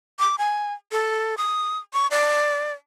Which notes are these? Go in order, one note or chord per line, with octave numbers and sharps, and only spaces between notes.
D6
G#5
A4
D#6
C#6
D5